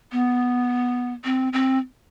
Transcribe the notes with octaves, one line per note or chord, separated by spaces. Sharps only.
B3
C4
C4